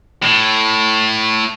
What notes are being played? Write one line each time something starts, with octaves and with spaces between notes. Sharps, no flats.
A2